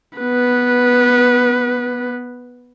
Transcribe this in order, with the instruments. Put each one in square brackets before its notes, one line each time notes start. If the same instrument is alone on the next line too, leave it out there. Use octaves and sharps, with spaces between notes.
[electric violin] B3 B4